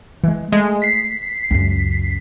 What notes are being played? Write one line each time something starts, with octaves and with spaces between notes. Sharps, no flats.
E3 G#3
G#3 A3
B6 C7
C#2 F#2